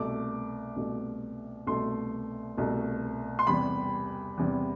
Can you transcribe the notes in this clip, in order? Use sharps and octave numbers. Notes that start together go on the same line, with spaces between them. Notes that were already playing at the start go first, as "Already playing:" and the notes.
Already playing: C2 B2 A3 D6
C2 B2 A3
C2 B2 A3 C6
C2 B2 A3
C6
E2 C3 G3 B5
E2 C3 G3